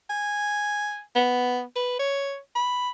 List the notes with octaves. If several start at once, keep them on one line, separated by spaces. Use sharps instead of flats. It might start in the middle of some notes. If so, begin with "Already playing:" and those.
G#5
B3
B4
C#5
B5